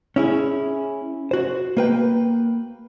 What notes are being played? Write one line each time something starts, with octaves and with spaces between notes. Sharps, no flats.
C#4 E4 G#4
F#4 C5
A#3 B4 G5